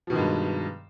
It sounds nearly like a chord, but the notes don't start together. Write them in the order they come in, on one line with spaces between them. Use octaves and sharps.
F3 B2 D#3 G#3 G2